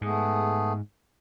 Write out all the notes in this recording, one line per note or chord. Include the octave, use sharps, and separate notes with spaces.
G#2 A3 B3 G#4